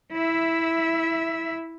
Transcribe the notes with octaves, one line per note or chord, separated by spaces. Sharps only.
E4 E5